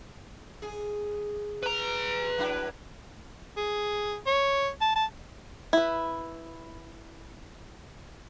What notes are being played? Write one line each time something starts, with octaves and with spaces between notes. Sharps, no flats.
G#4
B4 A#5
F#3 D4 E4
G#4
C#5
A5
A5
E4 B4